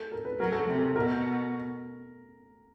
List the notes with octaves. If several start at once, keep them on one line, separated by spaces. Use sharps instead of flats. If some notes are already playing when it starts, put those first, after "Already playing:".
Already playing: A4
A#4
B4
F#3 A#4
A4
C3
A4
B2 A#4